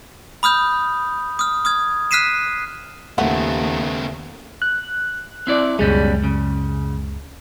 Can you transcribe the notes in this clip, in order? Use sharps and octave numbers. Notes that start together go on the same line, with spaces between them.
B5 D#6 F6 G6
D#6 F6
D#6 F6 G#6
F6 F#6 B6 C7 D#7 E7
D#2 C#3 F3 A3 B3 C4 F#4
F#6
C4 E4 D5
C#2 F#2 B2 G3 G#3 C#4
C#3